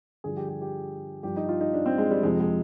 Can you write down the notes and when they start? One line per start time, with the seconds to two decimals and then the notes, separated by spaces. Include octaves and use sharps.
0.24 G2 D3 F3 G#4
0.37 G4
0.49 G4
0.61 G4
1.23 G2 F3 G4
1.37 D#4
1.49 F4
1.61 D#4
1.74 D4
1.86 C4
1.98 G#3
2.11 G3
2.23 F2 C3 F3 G#3
2.40 G#3